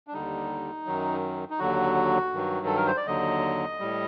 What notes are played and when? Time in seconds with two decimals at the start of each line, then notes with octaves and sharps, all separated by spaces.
0.07 D4
0.13 D#2 D3 G3 D#4
0.86 F#2 D#3 F#3
1.50 D#4
1.59 D#2 D3 F#3 F#4
2.33 G2 D#3 F#3
2.67 A4
2.76 A#4
2.87 C5
2.97 D5
3.07 D#2 D3 F#3 D#5
3.80 A2 G3